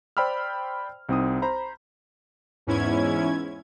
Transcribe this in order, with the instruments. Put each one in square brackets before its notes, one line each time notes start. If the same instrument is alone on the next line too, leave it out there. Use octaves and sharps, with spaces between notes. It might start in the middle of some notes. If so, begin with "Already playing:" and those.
[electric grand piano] C5 D5 G5 B5 E6 F6
C2 C4 D#4 D#6
C5 A#5 B5
[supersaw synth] E2 G#2 C#4 E4 G#6